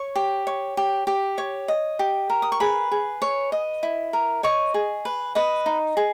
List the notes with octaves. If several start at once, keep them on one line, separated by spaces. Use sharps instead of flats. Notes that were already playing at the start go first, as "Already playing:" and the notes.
Already playing: C#5 C#6
G4
C#5
G4
G4
C#5
D#5
G4
A#4
D#6
C#6
G#4 B4 B5
G#4
C#5
D#5
E4
A#4
C#5 D#5 C#6
G#4
B4
B4 D#5 D#6
D#4
G#4